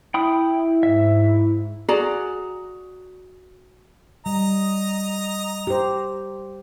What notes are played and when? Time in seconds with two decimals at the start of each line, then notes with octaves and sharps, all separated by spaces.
0.14 E4 G5 B5 D#6
0.83 G#2 E5
1.88 F#4 G#4 D5 A#5
4.26 G3 D#5 A#5
5.67 G4 C5